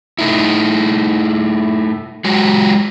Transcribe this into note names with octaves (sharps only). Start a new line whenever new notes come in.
A3 D#4 E4
F#3 G#3 F#4